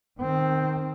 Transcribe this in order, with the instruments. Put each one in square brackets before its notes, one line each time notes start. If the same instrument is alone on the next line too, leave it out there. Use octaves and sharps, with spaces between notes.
[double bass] D#3 C4